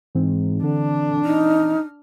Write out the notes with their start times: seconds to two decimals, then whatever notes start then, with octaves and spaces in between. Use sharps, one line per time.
0.15 G#2 E3 C4
0.63 D3 D4
1.25 D#4 F6